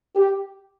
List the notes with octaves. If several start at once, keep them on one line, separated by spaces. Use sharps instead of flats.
G4